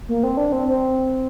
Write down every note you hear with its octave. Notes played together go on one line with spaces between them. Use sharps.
A#3
C4
D4
C4
C4